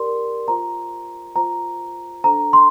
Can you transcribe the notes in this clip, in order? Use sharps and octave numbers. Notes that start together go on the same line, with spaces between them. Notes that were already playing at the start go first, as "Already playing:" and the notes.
Already playing: G4 A#4 D5 C6
F4 C5 A#5
F4 C5 A#5
D4 A4 C5 A#5
C6